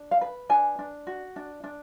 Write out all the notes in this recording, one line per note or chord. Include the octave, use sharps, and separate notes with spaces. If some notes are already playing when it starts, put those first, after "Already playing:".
Already playing: D4
F5
B4
D4 G#5
D4
F#4
D4
D4